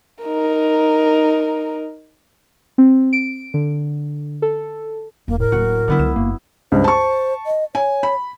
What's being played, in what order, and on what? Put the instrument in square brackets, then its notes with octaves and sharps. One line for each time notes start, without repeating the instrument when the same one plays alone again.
[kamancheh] D#4 A#4
[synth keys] C4
D7
D3
A4
[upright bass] E1 [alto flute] A#3
[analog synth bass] A2 [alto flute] A#4
[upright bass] D1 A#3 [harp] F#4
[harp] D3 B3 E4 [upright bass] F#3 G3
[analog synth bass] C#2 [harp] E7
[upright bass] F#1 [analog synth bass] A#3
[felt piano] C#2 G2 [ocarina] C5
[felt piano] A5 C#6
[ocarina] D#5
[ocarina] C#5 [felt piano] G#5
[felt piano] B5